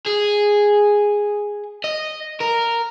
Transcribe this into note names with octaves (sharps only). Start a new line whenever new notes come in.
G#4
D#5
A#4